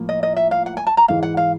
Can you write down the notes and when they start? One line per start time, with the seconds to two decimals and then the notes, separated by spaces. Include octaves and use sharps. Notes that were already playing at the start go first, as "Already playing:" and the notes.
Already playing: A2 F3 A#3
0.09 D#5
0.23 D#5
0.36 E5
0.51 F5
0.66 F#5
0.77 G#5
0.87 A5
0.97 A#5
1.08 G#2 E3 G#3 F5
1.23 F#5
1.37 F5